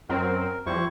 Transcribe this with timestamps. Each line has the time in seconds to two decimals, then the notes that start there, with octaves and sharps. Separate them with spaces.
0.09 F#2 F#3 C4 A#4
0.66 F2 G3 E4 C5 C#6